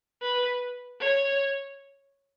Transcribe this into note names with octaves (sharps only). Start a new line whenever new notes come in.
B4
C#5